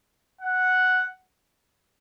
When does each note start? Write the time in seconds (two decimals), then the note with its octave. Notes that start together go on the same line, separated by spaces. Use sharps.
0.41 F#5